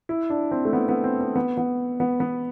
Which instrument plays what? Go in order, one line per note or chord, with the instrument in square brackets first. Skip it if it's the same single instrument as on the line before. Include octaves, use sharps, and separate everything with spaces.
[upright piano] E4
D4
C4
A3
B3
B3
C4
C4
B3
B3
B3
B3